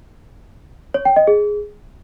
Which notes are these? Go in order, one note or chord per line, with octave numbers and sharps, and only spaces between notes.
C#5
G5
D#5
G#4